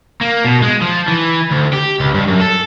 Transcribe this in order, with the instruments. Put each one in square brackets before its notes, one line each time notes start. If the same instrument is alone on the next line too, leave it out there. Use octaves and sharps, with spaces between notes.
[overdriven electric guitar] A#3
B2
G#3
F3
E3
D2
G4
C#2
G2
F#2
A4